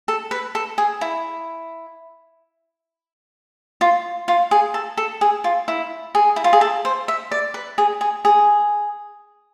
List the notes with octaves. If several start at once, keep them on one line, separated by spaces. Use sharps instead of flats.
A4
B4
A4
G#4
E4
F4
F4
G#4
A4
A4
G#4
F4
E4
G#4
E4
F4
G#4
A4
C5
E5
D5
B4
G#4
G#4
G#4